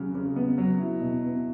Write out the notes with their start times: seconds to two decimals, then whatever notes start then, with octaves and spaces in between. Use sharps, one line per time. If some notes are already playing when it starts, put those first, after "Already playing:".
Already playing: C#3 F#3
0.15 C#3
0.36 B3
0.58 F#3
0.79 E4
1.00 B2
1.23 B3